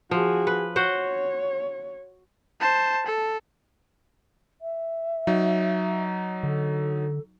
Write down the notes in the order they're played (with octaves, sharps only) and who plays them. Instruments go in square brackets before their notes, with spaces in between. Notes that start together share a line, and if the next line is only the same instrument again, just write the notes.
[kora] F3 [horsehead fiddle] F#4 G#4
[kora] B4
[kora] F#4 C5 F#5 [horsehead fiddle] C#5
[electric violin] C5 A5
A4
[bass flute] E5
[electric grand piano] F#3 D#4
[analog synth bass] D3 [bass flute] A4